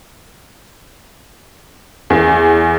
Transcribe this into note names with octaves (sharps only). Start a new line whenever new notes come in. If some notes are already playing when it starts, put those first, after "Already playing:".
E2